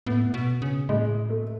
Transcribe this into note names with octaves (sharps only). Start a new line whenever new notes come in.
A2 B3
B2
C#3
A2 G#3
A3